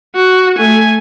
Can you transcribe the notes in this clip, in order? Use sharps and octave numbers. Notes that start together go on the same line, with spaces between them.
F#4
A3 G#5